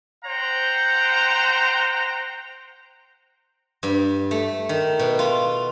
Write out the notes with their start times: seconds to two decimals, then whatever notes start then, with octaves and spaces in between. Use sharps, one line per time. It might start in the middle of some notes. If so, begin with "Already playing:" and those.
0.25 C5 F#5 G5 A#5
3.83 G2
4.31 A3
4.69 D#3
4.99 B2
5.19 F4